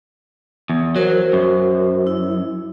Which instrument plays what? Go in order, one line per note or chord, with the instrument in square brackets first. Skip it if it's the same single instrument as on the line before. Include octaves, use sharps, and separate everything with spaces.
[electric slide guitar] E2
[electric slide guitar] F#3 [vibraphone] F#4 A#4 C5
[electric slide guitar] F#2
[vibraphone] E4